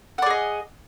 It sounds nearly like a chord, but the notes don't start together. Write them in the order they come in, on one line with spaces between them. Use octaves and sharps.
F#5 D5 G#4 D#5